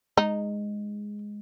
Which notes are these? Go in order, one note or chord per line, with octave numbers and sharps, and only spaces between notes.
G#3 D#4